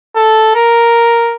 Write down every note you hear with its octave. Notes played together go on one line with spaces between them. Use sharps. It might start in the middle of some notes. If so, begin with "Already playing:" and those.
A4
A#4